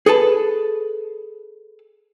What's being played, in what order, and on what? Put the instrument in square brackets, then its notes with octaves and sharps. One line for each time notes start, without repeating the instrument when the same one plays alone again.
[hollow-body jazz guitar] G#4 A4 B4 A5